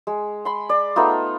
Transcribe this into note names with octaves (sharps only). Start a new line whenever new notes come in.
G#3
B5 C6
D5
A3 B3 D#4 F4